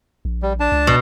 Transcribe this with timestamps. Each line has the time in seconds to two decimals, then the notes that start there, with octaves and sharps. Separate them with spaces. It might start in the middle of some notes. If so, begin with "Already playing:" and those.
0.25 A#1
0.42 G3
0.60 D4 A5
0.72 C#2
0.87 B2